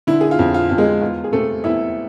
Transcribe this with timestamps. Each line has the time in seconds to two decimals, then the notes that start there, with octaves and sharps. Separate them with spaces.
0.07 D3 E4
0.21 G#4
0.31 F4
0.39 F2
0.54 F4
0.69 F2 F4
0.78 G#3 G#4
1.01 E2 F4
1.24 G#4
1.32 C3 A3 A4
1.64 E2 E4 E5